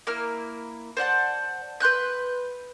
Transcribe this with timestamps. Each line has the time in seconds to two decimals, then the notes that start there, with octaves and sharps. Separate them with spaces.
0.07 A#3 E4 F6
0.97 C5 D5 F#5 A5
1.80 B4 C6 F#6 G6